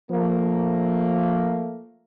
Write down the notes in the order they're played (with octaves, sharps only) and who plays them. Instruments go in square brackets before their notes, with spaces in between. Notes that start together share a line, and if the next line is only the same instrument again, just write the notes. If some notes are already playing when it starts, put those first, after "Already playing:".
[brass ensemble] F3 A3 A#3